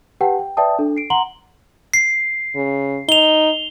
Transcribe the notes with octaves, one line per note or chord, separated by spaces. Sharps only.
G4 B4 F#5 G5 A5
G5
B4 D5 E5 G5 A5 D#6
D4 A4
C7 D7
F#5 A#5 C6 F#7 G7
C7
C#3
D#4 F7 G7